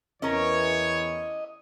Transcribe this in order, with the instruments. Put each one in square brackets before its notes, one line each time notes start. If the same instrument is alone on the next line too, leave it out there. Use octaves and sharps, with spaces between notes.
[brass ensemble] E2 E3 [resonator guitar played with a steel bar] C#4 A#4 [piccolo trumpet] C#5 [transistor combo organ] D#5